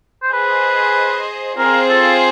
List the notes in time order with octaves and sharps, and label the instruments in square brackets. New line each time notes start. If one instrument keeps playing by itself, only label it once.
[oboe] C5
[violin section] G#4 C5 D#5 [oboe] B4
[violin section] C4 F4 G#4 C5 [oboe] A#4
[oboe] A4